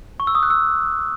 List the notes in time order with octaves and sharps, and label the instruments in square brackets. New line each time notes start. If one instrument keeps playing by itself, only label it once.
[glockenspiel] C#6
E6
D#6
F#6
E6